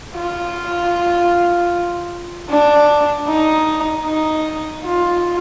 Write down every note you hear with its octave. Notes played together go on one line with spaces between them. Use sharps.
F4
D4
D#4
D#4
F4